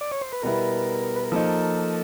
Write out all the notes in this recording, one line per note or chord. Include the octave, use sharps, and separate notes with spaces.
D5
C#5
C5
B4
B2 G3 B3 E4 A#4
B4
A#4
F3 A#3 D#4 A4